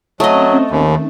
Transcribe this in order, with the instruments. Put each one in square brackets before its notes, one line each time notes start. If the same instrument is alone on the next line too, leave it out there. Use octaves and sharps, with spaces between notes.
[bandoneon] F#3 [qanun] A3 D#5 [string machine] C4 C#4 A5
[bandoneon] D#2 [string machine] D#3